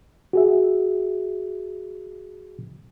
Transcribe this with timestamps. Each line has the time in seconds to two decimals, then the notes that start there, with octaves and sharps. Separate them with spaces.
0.33 F#4 G#4 E5